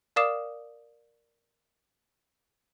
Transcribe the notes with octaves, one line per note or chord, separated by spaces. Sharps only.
A#4 D5 F5 D6 D#6 E7